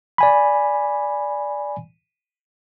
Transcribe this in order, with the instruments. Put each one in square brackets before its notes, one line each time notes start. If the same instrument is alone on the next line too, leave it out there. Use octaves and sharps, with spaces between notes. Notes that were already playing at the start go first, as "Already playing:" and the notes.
[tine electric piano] D5 G#5 B5